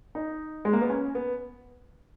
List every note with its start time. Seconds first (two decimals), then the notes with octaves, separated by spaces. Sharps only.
0.15 D#4
0.65 G#3
0.73 A#3
0.81 B3
0.90 C#4
1.15 B3